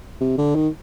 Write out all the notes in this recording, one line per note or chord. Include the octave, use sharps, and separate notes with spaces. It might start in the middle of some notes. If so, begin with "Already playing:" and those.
C3
D3
D#3